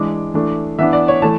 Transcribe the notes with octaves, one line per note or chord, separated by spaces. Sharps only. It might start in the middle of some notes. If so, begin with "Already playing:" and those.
Already playing: E3 G#3 D4 D6
E3 A3 D4
E3 B3 D4 E5
D5
C#5
E3 A3 A5